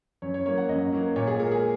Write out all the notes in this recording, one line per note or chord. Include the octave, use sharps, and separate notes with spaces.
F#2 C#5
C#5
F#3 A#3 C#5
F#5
F#2 D#5
F#3 A#3
A#2 C#5
G#4
G#3 A#4
G#4